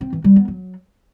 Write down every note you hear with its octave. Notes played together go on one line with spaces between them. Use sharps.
C4
E3
G3
B3
F#3